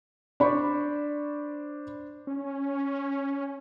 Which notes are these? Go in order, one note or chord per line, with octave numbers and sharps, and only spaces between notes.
D4 C5 D5 B5 C#6
C#4